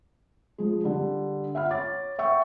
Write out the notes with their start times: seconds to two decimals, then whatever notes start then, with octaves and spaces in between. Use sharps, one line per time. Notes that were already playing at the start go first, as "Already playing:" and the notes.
0.58 F3 G#3
0.83 D3 G3
1.55 E5 F#5 B5 F6
1.71 C#5 D6 A6
2.19 E5 F#5 G5 C#6 E6